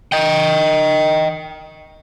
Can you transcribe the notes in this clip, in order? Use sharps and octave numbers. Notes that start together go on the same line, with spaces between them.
D#5 G5